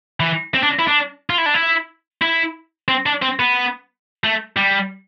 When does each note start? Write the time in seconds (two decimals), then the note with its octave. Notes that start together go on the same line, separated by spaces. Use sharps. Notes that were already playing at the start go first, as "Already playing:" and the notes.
0.20 E3
0.54 C4
0.63 D4
0.79 E4
0.87 D4
1.30 F4
1.38 E4
1.46 D4
1.54 E4
2.22 E4
2.88 C4
3.06 D4
3.22 C4
3.39 B3
4.24 A3
4.56 G3